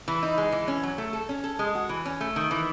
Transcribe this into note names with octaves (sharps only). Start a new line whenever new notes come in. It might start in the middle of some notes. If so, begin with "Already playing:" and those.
E3
D#4
G#3
E3
C#4
F#3
A3
A4
C#4
A4
G#3
F#4
E3
C#4
A3
D#3
E3